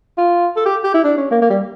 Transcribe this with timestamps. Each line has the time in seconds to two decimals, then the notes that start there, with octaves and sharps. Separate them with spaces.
0.18 F4
0.57 A4
0.66 G4
0.84 G4
0.94 E4
1.04 D4
1.17 C#4
1.31 A#3
1.42 A#3
1.50 G3